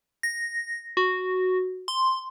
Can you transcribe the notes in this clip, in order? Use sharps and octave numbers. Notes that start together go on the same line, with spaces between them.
A#6
F#4
C6